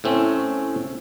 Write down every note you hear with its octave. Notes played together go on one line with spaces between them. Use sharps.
A2 A3 C4 C#4